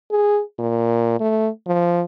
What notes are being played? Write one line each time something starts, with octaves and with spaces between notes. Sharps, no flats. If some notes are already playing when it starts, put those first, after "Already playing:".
G#4
A#2
A3
F3